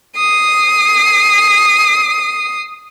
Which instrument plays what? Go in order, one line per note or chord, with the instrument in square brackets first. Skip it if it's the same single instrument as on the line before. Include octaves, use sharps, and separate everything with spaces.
[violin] D#6 C7